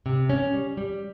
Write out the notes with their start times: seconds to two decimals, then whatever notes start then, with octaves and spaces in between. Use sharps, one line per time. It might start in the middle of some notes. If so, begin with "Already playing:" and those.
0.06 C3
0.30 C#4
0.54 G3
0.77 G3